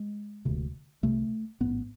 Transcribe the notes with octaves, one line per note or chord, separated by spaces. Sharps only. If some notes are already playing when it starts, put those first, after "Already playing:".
Already playing: G#3
E1 D2 C3
C2 C3 A3
A1 G#2 B3